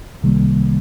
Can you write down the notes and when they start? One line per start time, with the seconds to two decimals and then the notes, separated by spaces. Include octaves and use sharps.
0.22 C2 C3 D#3 G3 A#3